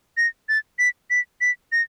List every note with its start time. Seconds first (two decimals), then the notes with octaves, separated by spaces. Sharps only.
0.17 A#6
0.49 A6
0.79 B6
1.10 B6
1.41 B6
1.72 A#6